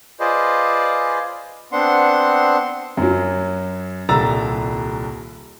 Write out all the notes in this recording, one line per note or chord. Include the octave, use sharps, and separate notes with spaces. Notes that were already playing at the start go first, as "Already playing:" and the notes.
F4 G#4 B4 C5 D5 D#5
B3 C4 D4 F#5 C6
F#2 F#3
D#1 C2 A#5 E6 A6